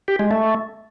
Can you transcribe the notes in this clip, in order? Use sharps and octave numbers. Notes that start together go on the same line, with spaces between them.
G4
G#3
A3